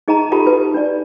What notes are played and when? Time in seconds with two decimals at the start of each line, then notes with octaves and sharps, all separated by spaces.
0.08 D#4 G#4 D#5 A5 A#5
0.32 F4 G4 A4 A5 B5
0.47 F#4 B4
0.74 D4 D5